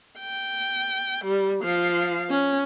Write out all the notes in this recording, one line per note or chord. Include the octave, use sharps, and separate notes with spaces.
G5
G3
F3 F5
C#4